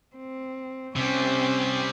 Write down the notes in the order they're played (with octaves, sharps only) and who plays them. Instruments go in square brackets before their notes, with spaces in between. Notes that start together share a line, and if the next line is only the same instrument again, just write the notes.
[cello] C4
[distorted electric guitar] C3 G3 [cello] C4 C#4